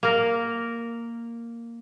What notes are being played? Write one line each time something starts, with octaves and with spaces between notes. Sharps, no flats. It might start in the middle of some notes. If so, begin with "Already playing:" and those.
A#3 A#4